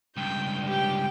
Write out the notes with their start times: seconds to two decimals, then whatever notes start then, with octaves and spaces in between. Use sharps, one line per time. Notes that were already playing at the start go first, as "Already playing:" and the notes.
0.17 C#2 G2 G5
0.66 G4 G5